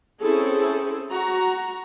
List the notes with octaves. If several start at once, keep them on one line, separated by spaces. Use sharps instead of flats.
C4 C#4 E4 G#4 A4
F#4 A#5